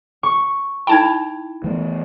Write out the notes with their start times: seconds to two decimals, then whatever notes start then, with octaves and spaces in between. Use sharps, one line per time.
0.23 C#6
0.87 D#4 E4 G5 A5 B5 G#6
1.64 E3 A3 B3